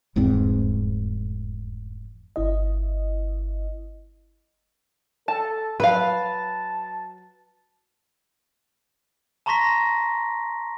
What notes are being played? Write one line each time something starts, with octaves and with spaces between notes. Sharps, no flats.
F1 E2 G#2 C4
G1 E4 D#5
A4 A5
F#3 B4 F5 A5
A5 A#5 C6 C#6 A#6 B6